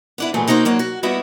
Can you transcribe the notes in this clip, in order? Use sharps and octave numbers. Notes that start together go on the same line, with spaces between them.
B3 D4 E4
A#2 E3 F#3 G#3 A3
A#3 D#4 F#4 B4 C5
F#3 A#3 D4
F#4
G3 A#3 B3 E4 F#4 D#5